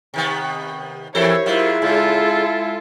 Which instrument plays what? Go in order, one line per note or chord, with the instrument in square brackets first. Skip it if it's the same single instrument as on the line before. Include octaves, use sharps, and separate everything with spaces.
[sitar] C3 D#3 B3
[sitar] E2 A4 [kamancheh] E4 C#5 [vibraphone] G4 A#4 C5
[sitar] G#2 F#3 [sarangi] E4 [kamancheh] F4
[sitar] G#2 C#3 [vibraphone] G#3 [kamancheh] F4 A4